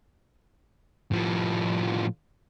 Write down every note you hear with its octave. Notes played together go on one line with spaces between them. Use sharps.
A2 F3